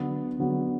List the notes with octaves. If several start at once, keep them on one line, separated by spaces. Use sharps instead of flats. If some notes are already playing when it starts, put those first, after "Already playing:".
Already playing: D3 F#3 B3
D3 F#3 B3